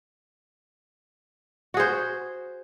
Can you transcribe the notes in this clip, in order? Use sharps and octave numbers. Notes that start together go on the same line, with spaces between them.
F#4 G#4 C5